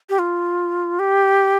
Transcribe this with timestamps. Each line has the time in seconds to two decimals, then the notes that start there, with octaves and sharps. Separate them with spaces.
0.10 G4
0.19 F4
0.99 G4